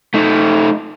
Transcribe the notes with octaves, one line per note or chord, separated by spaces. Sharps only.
A3 D#4